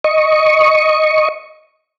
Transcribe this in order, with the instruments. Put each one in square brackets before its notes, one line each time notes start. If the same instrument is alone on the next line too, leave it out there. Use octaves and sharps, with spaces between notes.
[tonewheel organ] D#5 C#6